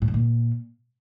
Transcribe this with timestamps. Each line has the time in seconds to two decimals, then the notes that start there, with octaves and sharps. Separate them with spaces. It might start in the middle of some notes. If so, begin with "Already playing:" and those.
0.02 A2
0.08 D#3
0.14 A#2